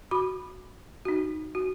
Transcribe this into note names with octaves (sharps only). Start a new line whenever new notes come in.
F#4 B5 D6
D#4 F#4
F#4